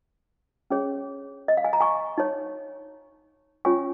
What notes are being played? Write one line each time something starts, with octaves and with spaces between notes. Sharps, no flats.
C#4 G#4 C#5
D#5
F5
G#5
A#5
G#5 C#6
D#4 C#5
C#4 F4 C#5 G#5 C#6